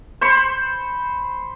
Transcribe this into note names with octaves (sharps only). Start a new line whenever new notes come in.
C5 B5 C#6